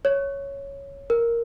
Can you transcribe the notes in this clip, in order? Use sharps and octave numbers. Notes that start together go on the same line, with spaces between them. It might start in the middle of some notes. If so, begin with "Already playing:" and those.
C#5
A#4